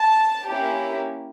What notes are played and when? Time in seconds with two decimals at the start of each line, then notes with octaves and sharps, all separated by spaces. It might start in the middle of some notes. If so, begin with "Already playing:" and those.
Already playing: A5
0.49 A#3 C#4 E4 G4